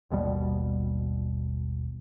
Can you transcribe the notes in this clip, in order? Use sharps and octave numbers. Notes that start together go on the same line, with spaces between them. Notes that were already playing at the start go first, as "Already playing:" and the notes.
G#1 D#2 B2 G3